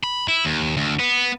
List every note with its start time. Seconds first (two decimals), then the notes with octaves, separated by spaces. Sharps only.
0.04 B5
0.28 E4
0.45 D#2
0.77 D2
0.99 B3